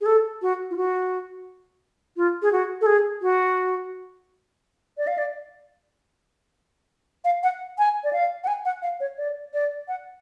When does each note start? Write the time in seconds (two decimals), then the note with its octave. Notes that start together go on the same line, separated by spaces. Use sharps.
0.01 G#4
0.06 A4
0.42 F#4
0.71 F4
0.77 F#4
2.17 F4
2.42 G#4
2.52 F#4
2.81 A4
2.86 G#4
3.22 F#4
4.98 D5
5.07 F5
5.18 D5
7.25 F5
7.43 F#5
7.78 G#5
8.04 D5
8.13 F5
8.44 F#5
8.48 G#5
8.65 F#5
8.82 F5
9.00 C#5
9.18 D5
9.54 D5
9.88 F#5